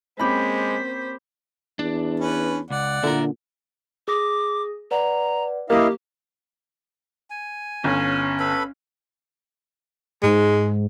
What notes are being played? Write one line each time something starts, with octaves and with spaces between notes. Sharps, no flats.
G#3 A#3 C4 C#4 G4 C5 B5 B6
E2 D4
C#4 B4
C#2 D5 F#5
A#2 D3 E4 A#4
G#4 D6 D#6 A#6
B4 D5 F#5 A#5
A#3 E4 G4 D#5 F5
G#5
G1 C#4
A4 B4 B5
G#2 G#3